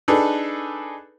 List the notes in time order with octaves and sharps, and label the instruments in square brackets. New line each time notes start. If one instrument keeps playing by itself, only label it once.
[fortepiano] D4 D#4 G#4 A4 B4